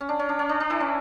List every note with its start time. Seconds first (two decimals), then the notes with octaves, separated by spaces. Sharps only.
0.01 C#4
0.09 D4
0.19 C#4
0.29 D4
0.39 C#4
0.49 D4
0.60 D4
0.70 E3 E4
0.80 C#4